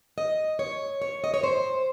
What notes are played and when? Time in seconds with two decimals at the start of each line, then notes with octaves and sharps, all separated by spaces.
0.18 D#5
0.59 C#5
1.02 C#5
1.24 D#5
1.34 C#5
1.43 C5